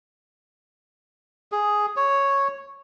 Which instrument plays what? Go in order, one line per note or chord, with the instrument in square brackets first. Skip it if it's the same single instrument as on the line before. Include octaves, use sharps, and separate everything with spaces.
[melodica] G#4
C#5